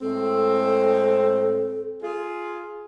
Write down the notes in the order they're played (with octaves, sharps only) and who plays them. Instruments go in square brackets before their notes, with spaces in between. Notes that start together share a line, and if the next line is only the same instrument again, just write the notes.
[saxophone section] A2 G#3 C4 [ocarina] A4
[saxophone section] F4 G#4